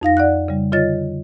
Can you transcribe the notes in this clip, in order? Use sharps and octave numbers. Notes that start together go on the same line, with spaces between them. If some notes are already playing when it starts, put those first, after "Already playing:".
F2 D#4 F5 A#6
D5 F#5 F#6
C#3 G3
D3 F4 C#5 D#5 A6